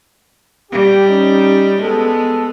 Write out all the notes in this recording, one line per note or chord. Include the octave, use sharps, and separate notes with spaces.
G3 G4
C#4 D#4
G#3 B3 A4